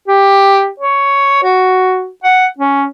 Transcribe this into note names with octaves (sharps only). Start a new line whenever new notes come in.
G4
C#5
F#4
F#5
C#4